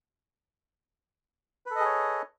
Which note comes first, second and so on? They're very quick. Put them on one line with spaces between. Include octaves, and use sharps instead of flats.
B4 A4 D#5 G#4 C#5